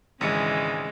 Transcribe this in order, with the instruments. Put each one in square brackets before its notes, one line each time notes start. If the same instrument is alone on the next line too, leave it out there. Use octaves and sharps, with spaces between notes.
[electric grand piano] G#1 C#7 [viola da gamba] C#3 E3 G#3